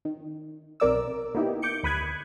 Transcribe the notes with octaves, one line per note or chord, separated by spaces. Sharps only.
D#3
B1 C3 A#4 D5 D6 E6
A#3 B3 D#4 E4 G4
D6 G6 C#7
D2 B5 D#6 F#6 G#6